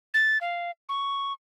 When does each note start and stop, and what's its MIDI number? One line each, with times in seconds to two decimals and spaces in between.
0.14 0.38 93
0.41 0.71 77
0.89 1.33 85